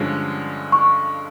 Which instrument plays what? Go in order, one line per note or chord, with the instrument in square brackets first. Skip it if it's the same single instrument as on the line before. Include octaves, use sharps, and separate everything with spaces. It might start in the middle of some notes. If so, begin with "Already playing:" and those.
Already playing: [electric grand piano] G2 D3 F3 G#3 C#4
[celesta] C#6